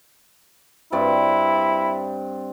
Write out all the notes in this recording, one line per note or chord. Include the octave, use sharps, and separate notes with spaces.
G2 C4 E4 D5